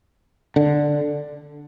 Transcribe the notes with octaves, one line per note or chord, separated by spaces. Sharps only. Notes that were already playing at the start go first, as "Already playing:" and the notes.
D3